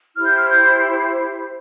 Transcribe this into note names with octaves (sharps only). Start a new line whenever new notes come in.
E4 G4 C5 F6
G6
F6
G6